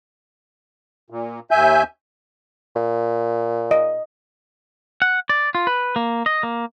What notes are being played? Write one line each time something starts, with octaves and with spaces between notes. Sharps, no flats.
A#2
D#2 E5 G#5 G6
A#2
D#5
F#5
D5
F4
B4
A#3
D#5
A#3